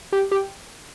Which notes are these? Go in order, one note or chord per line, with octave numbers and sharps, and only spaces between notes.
G4
G4